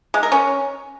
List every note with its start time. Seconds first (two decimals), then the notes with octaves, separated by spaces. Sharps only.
0.14 G#3
0.23 A#4
0.32 C#4